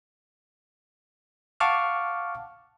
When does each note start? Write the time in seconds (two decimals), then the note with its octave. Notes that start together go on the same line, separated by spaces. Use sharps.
1.60 F5 F#5 A5 C#6 D6 F6